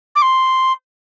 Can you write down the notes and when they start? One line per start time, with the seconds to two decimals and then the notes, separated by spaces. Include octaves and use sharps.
0.15 D6
0.22 C6